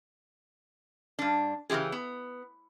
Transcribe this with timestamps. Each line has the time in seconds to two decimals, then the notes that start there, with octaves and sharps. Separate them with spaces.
1.19 G2 D4
1.70 C#3 E3 F3 G4 G#4
1.92 B3